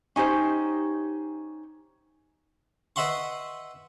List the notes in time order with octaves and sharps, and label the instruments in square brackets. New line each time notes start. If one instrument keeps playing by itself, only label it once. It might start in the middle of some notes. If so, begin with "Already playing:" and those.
[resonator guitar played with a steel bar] C#4 D#4 G4 C5
[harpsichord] B4 D#5 E5 F#5 C6 C#6